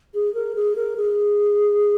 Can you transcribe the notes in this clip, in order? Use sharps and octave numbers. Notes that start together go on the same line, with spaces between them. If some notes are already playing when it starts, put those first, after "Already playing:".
G#4
A#4
G#4
A#4
G#4